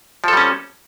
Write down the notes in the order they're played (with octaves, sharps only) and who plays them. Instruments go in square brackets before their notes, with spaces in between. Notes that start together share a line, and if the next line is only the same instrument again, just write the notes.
[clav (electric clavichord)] F3
A4
G3
C#4